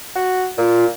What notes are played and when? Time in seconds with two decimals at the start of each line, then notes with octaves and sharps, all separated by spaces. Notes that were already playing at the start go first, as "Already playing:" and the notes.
0.16 F#4
0.58 A#2 F4